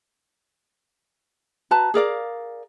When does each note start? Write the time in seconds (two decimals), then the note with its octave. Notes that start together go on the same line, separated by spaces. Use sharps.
1.71 F#4 B4 A5 A#5
1.94 G#4 A#4 D5 F5